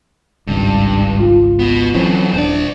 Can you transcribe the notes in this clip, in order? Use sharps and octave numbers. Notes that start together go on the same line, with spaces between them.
G#1 C#2 G2
F4
B3 F#4
E3 F#3 A3 C4 C#4
D#1 G2 D4 C5 D5